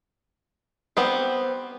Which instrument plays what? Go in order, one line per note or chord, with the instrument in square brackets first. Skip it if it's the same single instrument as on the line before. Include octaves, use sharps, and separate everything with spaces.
[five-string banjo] B3 C4 G4